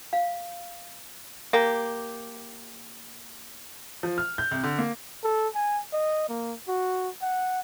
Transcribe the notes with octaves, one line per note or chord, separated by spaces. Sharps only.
F5
A#3 G4
F3
F6
G6
C2
D3
A#3
A4
G#5
D#5
A#3
F#4
F#5